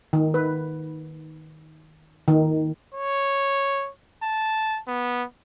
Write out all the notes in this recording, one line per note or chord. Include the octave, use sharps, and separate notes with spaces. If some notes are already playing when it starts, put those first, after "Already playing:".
D#3
B4
D#3
C#5
A5
B3